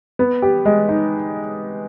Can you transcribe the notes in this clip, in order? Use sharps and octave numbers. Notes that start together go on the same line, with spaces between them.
B3
G4
G#3
D#4